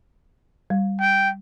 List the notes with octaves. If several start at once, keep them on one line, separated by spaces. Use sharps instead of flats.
G3
G5